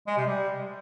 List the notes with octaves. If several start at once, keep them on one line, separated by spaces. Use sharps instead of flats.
G#3
C3
G3